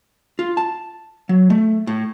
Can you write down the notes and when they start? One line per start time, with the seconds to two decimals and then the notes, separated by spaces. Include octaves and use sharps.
0.39 F4
0.57 A5
1.29 F#3
1.50 A3
1.87 A2